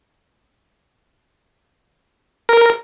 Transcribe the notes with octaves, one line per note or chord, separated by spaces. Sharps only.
A#4